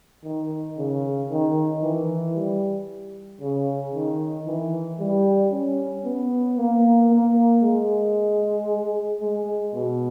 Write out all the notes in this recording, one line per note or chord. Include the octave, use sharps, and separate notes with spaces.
D#3
C#3
D#3
E3
G3
C#3
D#3
E3
G3
C#4
B3
A#3
A#3
G#3
G#3
B2